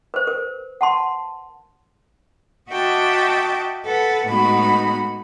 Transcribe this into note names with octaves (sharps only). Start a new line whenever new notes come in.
B4 C5
A#4 B4
F#5 A5 C6
F#4 D#5 E5 G5 A5 D6
A4 B4 F#5
A2 G#3 B3 D#4 F#4 B5